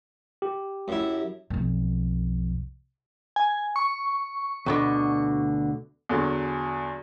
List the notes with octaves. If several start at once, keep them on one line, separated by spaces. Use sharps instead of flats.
G4
F#2 E4
B1 F2
G#5
C#6
D2 B2 D3
E2 D3 F#3